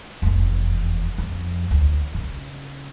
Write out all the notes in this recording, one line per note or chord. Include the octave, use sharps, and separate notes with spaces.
F1 E2
F2
D2
C#3